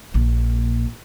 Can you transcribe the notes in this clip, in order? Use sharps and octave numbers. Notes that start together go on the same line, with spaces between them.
A#1 A#2